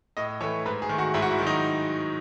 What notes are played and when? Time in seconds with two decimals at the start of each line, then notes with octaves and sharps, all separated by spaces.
0.17 A2 D#5
0.40 E3 A3 C#5
0.66 G#2 B4
0.82 G#4
0.89 D#3 A3
0.98 F#4
1.14 G#2 E4
1.22 F#4
1.31 E4
1.38 D#3 F#3
1.47 D#4